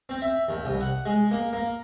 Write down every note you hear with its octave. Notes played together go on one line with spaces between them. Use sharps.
C4
E5
D#2
C2
F#5
G#3
A#3
A#3